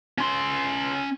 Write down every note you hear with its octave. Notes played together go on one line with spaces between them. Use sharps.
C#4 C6